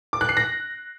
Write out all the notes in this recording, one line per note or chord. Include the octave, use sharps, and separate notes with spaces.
D6
F#6
C7
A#6